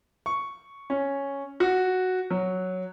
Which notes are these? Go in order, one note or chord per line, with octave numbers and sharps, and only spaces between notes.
C#6
C#4
F#4
F#3